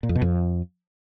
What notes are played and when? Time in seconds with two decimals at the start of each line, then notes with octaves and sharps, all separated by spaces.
0.03 A#2
0.09 F2
0.15 B2
0.22 F2